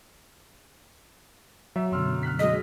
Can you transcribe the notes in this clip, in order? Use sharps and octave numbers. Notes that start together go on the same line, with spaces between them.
F#3 E5
F#2 B2 D3 C6 E6 F6
F6 F#6 B6
F#3 G#3 G#4 D#5 B6